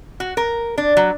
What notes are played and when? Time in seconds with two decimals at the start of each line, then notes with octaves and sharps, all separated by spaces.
0.20 F#4
0.37 A#4
0.78 D4
0.97 F#3